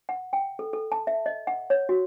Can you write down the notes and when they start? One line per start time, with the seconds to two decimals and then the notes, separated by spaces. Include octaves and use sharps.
0.09 F#5
0.33 G5
0.59 A4
0.73 A4
0.92 A5
1.07 E5
1.26 D#5
1.47 F#5
1.70 C#5
1.89 F#4